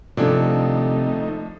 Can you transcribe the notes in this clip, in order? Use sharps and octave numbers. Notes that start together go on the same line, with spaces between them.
C3 D#3 F3 A3 D4 D#4 A4